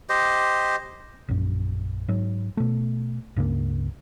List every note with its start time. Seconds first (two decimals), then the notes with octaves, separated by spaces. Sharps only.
0.09 G4 C5 D#5
1.29 A#1 F#2
2.08 G#2 F#3
2.57 B2 A3
3.36 C#2 G2 C#3 A#3